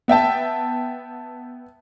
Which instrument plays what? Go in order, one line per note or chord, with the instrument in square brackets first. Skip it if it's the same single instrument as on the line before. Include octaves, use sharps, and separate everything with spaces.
[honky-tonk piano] B3 E5 G5 A5